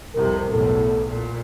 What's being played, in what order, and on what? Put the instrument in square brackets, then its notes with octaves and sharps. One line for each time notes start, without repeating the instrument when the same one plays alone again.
[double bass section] C2 F2 C3 [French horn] A#4
[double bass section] B1 E2 A2 [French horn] A4
[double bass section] A#2